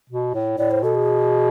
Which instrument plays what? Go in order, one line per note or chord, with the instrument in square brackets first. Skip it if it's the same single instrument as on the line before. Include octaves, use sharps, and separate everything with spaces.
[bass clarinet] B2
A2
[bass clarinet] A2 [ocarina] D5
[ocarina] C5
[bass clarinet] B2 [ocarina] A4
[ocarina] G#4